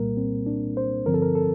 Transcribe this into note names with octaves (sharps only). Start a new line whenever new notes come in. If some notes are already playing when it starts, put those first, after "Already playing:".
Already playing: C2 A#2 G3 A#3 A#4
C4
D4
C5
G2 D3 F3 C4 A#4
A4
A#4
A4